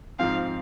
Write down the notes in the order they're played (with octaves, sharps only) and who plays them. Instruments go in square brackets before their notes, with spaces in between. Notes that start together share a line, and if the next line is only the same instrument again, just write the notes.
[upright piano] G#2 F3 C4 [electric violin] F5